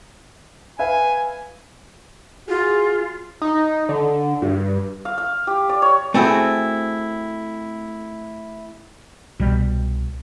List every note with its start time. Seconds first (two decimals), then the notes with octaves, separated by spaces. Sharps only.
0.79 B4 E5 F5 G#5
2.49 F4 F#4 G#4
3.42 D#4
3.89 D3
4.42 G2
5.05 F5
5.18 F5
5.47 G4
5.69 D5
5.82 C#5
6.14 A3 C4 E4 F#4 G#4
9.40 C2 B2 G3